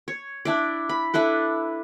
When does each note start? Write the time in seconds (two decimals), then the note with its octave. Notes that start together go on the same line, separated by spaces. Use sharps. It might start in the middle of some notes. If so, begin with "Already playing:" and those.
0.08 C#5
0.45 D4 E4 D5
0.89 B5
1.14 D4 E4 A4 B4